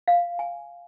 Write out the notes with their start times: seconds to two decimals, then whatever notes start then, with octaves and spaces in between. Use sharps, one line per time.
0.08 F5
0.39 G#5